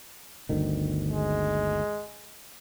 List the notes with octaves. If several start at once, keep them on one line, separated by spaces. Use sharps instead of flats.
G1 D2 D#3
G#3